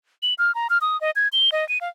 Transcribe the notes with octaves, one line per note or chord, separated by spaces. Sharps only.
F#7
F6
A#5
F6
D#6
D#5
G#6
G7
D#5
D#7
F5